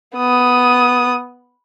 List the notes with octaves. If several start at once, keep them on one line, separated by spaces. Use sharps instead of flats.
B3 D#6